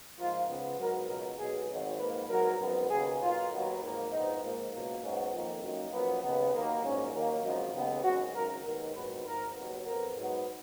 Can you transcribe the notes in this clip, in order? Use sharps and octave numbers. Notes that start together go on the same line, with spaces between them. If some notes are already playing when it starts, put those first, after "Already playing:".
G#2 F3 A#3 F4
C#2 C#3 F3 B3
G#2 F#3 B3 A#4
C#2 B2 F#3 A#3 A#4
B1 B2 G#3 B3 G#4
G#1 G#2 F#3
G#2 F3 A#3 B4
G#2 F#3 B3 A#4
G#1 F#2 F3 B3
D#2 C#3 F#3 B3 G#4
B1 B2 A#3 F4
D#2 D#3 F#3 B3
G#1 G#2 F3 A#3
A#1 G#2 F3 B3 D#4
G#2 F3 A#3
C#2 B2 F#3 A#3
G#2 F#3 B3 C#4
F2 D#3 A#3
F#2 D#3 A#3
F#2 F3 A#3 B3
D#2 C#3 G#3 B3
D#2 D#3 F#3 A#3
A#1 G#2 F#3 A#3 C#4
D#2 D#3 F#3 A#3
G#1 F#2 C#3 F3 D#4
D#2 C#3 G#3 B3
G#1 F#2 C#3 G#3 F#4
G#1 F#2 C#3 A#4
D#2 D#3 G#3 B3 A#4
A#1 G#2 D#3 F#3 B3 B4
G#1 G#2 F3 A#4
D#2 C#3 F#3 B3
F2 F3 B3 A#4
G#2 F#3 B3